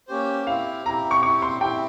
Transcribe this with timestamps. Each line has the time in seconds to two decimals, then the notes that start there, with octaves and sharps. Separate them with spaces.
0.08 A#3 C#4 G4 C5
0.47 C4 E4 G4 F5
0.86 C4 E4 G4 A#5
1.11 C#6
1.23 C4 E4 G4 C#6
1.42 C6
1.61 C4 E4 G4 G5